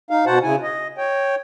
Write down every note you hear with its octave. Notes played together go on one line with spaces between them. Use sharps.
D#4 F5
B2 F#4 C5 F#5 A5
C#3 E4 G#5
D#5
C#5 G5